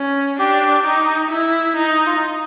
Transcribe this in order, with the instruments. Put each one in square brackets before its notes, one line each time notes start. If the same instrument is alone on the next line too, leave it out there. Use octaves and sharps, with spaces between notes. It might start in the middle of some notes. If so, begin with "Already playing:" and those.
Already playing: [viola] C#4
[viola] D4 [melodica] G4
[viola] D#4
E4
D#4
[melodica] F4